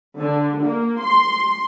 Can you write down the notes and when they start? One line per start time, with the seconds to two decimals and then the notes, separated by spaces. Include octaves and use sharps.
0.19 D3
0.63 A#3
1.02 C6